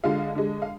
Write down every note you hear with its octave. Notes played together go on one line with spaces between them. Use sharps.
D3 G#3 F4 F5
D3 G#3
F5